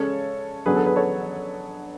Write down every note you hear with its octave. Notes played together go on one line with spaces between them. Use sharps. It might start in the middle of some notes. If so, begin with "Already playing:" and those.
Already playing: C#3 G#3 C#4 A4 C#5
D3 F#3 B3 G#4 B4
A4
G#4 B4
A4 C#5